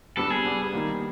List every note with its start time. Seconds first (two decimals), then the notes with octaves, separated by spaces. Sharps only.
0.17 G3 B3 D4 A4
0.30 G#4
0.45 G3 B3 D4
0.73 D#3 G3 A#3